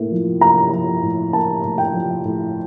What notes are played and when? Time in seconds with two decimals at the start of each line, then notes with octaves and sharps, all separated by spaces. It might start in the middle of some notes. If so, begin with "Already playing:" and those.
Already playing: A2 A#3
0.11 F3
0.41 A#3 A#5
0.72 F3
1.02 A2
1.33 A#3 A5
1.64 A2
1.78 G5
1.93 F3
2.24 A2